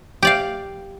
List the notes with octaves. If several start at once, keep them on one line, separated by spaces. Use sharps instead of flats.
G4 D5 F5